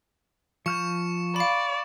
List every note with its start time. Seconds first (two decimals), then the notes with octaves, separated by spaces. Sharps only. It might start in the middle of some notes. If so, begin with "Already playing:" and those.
0.66 F3 C#6 F6 G6 C#7 E7
1.36 D5 F5 B5